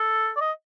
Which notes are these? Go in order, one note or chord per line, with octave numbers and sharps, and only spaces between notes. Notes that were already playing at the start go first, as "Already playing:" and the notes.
Already playing: A4
D5
D#5